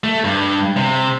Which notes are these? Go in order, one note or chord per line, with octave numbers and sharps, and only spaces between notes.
A3
G2
C3